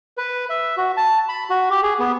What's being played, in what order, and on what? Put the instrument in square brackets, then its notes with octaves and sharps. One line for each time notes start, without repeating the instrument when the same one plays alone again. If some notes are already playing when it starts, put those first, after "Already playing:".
[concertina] B4
E5
F#4
A5
B5
F#4
G4
G#4
B3